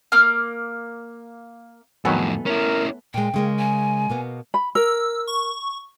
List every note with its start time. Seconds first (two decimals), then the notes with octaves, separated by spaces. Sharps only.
0.12 A#3 D6 F6
2.05 F2 A2 D#3 F#3 A3 B3 A4 G#5
2.46 C#4 E4 A#4
3.14 A#2 G#3 G5
3.34 C#3 G#3 A#3
3.59 G#5
4.10 B2 A#3 B3
4.54 B5
4.75 A#4 E6
5.27 C#6